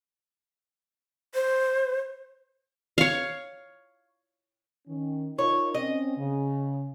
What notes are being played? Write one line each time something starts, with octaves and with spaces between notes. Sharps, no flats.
C5
C#5 F5
D#3 C#4
D#4 F4 A#4 C#5
C4 C#4 D#5
C#3